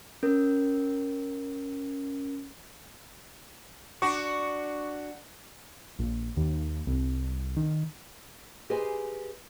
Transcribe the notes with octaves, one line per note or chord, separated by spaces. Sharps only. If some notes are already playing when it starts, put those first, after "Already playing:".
C#4 A#4
D4 F#4 C#6
A#1
D#2
C2
D#3
G4 G#4 B4 C5 D#5 G#5